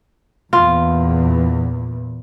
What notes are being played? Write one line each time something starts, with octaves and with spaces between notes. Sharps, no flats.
E2 A#2 F4